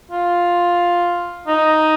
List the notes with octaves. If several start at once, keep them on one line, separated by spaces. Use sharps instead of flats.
F4
D#4